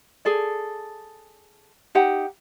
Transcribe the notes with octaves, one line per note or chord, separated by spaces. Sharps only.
G#4 A4 D5
D#4 G4 F#5